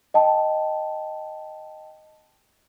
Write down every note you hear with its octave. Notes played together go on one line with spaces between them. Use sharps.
D#5 G5 A5